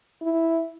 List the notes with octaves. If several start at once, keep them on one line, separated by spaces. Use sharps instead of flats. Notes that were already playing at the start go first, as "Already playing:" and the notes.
E4